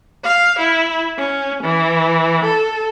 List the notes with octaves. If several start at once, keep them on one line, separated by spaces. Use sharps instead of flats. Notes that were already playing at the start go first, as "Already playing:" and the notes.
F5
E4
C#4
E3
A4